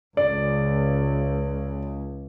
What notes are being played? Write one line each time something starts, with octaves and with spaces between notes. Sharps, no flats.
C#2 D5